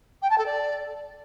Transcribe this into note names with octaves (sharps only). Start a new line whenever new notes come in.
G5
A5
A4
D5